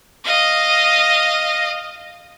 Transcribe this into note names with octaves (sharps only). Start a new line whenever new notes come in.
D#5 F5